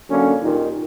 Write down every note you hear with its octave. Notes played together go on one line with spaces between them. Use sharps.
D3 F#3 A#3 C#4
D#2 A#2 D#3